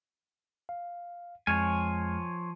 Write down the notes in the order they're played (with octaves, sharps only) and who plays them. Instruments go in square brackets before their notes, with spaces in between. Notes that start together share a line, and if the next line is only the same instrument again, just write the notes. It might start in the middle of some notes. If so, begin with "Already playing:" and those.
[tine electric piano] F5
[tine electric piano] F2 G#3 F6 [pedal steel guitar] F3 C#5 G#5